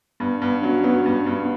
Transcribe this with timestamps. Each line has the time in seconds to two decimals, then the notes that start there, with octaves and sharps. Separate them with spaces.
0.20 G2 B3
0.42 G2 B3
0.57 D4
0.62 F#3 C#4
0.84 F#3 B3
1.06 G2
1.26 G2
1.36 B3